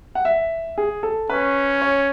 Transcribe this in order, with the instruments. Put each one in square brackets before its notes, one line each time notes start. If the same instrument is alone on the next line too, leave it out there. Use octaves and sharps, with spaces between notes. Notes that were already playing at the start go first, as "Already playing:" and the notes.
[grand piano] F#5
E5
G#4
A4
[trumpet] C#4 [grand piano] B4
[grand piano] C#5